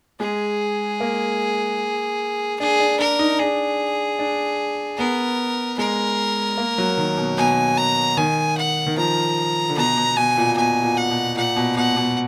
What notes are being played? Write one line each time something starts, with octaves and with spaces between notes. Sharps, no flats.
G#3 G#4
A#3
D4 G#4
D4
D4 A#4
D#4
D4 G#4
D4
B3 A#4
G#3 A#4
A#3
F#3
D#3
B2
B2 G#5
A#5
D#3 G#5
F#5
D#3
F3 A#5
D3
B2 A#5
B2
B2 G#5
A#2
B2 G#5
A#2
F#5
B2
A#2 F#5
B2
B2 F#5
B2